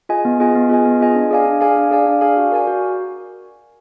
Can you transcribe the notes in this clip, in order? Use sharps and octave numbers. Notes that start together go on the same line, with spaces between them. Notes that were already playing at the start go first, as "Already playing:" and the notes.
F4 G#4 D#5 G#5
B3
F4 G#4 D#5 G#5
B3
F4 G#4 D#5 G#5
B3
F4 G#4 D#5 G#5
D4
G#4 D5 F5 G#5
D4
G#4 D5 F5 G#5
D4
G#4 D5 F5 G#5
D4
G#4 D5 F5 G#5
F#4
A#4 D5 G#5
F#4